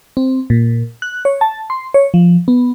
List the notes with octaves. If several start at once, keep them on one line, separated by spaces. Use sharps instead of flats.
C4
A#2
F#6
C#5
A5
C6
C#5
F3
B3